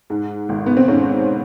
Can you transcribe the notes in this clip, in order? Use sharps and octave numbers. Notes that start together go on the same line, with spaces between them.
G#2
G#1
B3
C4
G#2 C#4